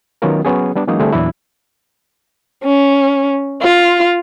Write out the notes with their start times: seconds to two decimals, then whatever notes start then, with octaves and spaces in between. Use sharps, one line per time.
0.22 D#3 F#3 B3 C#4 F4 A#4
0.45 F#3 B3 C#4 G#4
0.75 G3 B3 D4
0.87 E3 F#3 G#3 A#3 C#4 D#4
0.99 D3 G3 A3 C4 E4 G#4
1.13 E2 A#2 F#3 D4 E4
2.63 C#4
3.62 F4